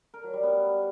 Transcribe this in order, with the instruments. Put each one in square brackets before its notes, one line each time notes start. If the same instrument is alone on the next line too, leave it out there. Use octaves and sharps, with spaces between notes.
[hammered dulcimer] A#4
F#3
G3
B3